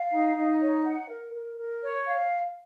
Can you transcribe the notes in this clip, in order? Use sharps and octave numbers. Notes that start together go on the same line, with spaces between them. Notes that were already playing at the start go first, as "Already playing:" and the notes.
Already playing: F5
D#4
D#4
C#5
F#5
A#4
A#4
A#4
C#5
F5